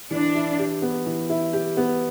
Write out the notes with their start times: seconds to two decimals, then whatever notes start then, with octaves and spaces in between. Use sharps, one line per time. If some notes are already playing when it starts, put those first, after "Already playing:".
0.11 E3 D4
0.35 E4
0.59 G4
0.82 B3
1.06 E3
1.30 E4
1.53 G4
1.77 B3